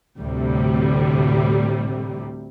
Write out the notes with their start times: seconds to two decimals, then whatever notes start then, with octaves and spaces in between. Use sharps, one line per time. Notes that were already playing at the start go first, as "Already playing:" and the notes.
0.19 D2 A2 C3 G3